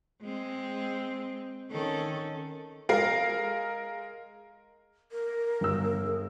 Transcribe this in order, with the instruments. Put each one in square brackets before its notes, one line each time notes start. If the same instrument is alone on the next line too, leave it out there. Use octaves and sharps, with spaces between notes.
[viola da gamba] G#3 C4
D#3 C#4 A4
[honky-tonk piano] G#3 A#4 F5 C7
[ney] A#4
[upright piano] G1 E6
[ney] G#4